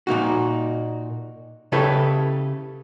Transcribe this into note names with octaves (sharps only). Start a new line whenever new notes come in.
A#2 A#3 D#4 F#4
C#3 E4 G4 A4 B4 C#5